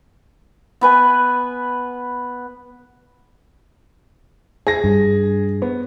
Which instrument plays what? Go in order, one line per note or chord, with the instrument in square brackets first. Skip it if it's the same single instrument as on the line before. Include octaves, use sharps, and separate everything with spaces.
[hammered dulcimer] B3 B4 G#5
[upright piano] G#4 A#6
[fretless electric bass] G2
[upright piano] B3